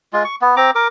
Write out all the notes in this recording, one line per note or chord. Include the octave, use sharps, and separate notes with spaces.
G#3 F4
C#6
B3
C4 A#5 D6
A#4 D6